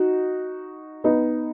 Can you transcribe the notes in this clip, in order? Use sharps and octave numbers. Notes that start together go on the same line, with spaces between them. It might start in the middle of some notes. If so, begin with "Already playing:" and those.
Already playing: D#4 F#4
B3 D#4